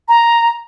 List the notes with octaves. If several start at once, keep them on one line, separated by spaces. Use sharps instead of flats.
A#5